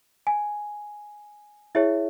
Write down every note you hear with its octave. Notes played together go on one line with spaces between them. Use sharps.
G#5
E4 G#4 C#5 E5